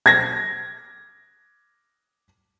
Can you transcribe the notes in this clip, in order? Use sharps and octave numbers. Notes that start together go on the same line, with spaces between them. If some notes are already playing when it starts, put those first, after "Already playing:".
G#6 A#6